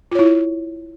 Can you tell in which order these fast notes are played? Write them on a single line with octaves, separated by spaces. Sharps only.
F4 C#5 E4